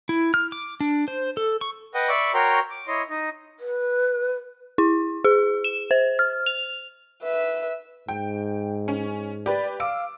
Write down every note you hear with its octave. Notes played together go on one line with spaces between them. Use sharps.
E4
F6
D6
D4
C5
A4
C#6
B4 D#5 F#5 G5 D#6
D5 E5 B5 C#6 D6
F#4 A#4 C#5 G5 A#5 C6
D6
E4 C#5 D#5 C6
D#4 D#5
B4
E4
G#4
E7
C5
F6
F7
B4 E5
G#2 G5
C#4
G4 B4 D5
F5 D6 E6 D7